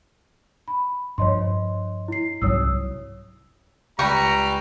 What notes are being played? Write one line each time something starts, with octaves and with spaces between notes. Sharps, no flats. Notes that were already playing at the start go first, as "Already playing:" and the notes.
B5
G2 F3 C#5 D#5 C6
E4 C7
C2 G#2 F#3 C#5 D#6 E6
C#2 G3 B4 G5 A#5 C#6